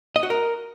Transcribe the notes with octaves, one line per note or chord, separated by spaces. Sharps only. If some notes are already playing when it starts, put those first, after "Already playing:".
D#5
F#4
A#4